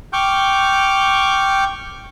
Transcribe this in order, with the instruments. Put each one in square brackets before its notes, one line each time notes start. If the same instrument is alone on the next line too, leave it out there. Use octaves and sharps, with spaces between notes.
[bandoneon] G5 C#6 D6 F6 G6